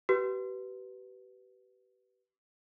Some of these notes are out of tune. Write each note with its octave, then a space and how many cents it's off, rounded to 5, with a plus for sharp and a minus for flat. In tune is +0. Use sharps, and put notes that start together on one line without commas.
G4 -40 B4 +0